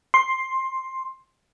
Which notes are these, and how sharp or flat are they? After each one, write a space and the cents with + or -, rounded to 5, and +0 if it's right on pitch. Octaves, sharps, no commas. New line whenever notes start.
C6 +10